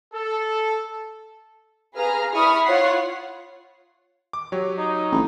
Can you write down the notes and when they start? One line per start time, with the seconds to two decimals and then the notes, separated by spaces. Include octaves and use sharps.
0.14 A4
1.95 G#4 B4 F5 A#5 F6
2.35 E4 D5 B5 C#6 D#6 F6
2.65 F4 C#5 F#5 C7
4.33 D6
4.52 F#3 G4 C#5
4.78 D#4
5.12 A1